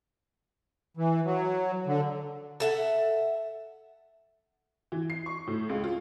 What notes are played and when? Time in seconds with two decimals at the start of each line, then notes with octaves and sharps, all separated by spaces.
0.97 E3
1.25 F#3
1.87 D3
2.60 A4 E5 F#5
4.92 E3
5.10 C7
5.26 C#6
5.47 A2
5.69 C#2
5.84 F4